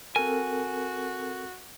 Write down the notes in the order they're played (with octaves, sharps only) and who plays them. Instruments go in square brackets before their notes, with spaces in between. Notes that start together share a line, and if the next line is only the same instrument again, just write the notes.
[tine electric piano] C4 A4 A#4 [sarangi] F#4 [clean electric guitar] G#5